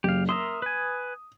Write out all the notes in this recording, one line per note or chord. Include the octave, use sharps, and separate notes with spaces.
F#1 G4 F5
A#4 E5 C6 D#6
B4 G#5